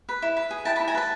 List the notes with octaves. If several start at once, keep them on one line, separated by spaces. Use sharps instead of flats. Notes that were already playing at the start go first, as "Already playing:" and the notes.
B4
E4
B4
G#4
E4 G5 A5
A5 B5
E4
G#5 A#5
B4 A5 B5